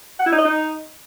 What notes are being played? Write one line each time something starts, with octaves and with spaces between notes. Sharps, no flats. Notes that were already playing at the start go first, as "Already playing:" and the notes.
F#5
E4
D#4
D#5
D#4